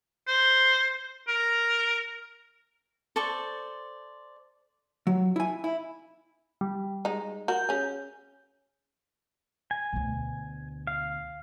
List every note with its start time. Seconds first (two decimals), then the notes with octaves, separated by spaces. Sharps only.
0.28 C5
1.28 A#4
3.16 A4 C5 D5 C#6
5.07 F#3
5.36 E4 G#5
5.64 E4
6.61 G3
7.05 G#3 D#4
7.48 F#4 A#4 G6
7.69 C#4 G#4
9.71 G#5
9.93 D2 B2
10.87 F5